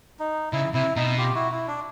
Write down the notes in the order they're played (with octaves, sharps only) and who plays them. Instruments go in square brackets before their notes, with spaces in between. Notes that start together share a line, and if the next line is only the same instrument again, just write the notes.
[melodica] D#4
[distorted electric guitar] C#3 [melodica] E4
[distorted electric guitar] C3 [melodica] E4
[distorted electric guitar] B2 [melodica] D#4
[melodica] F4 G4
E4 F#4
E4
D4